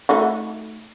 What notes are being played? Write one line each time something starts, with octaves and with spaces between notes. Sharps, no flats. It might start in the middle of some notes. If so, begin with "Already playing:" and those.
A3 D#4 F#4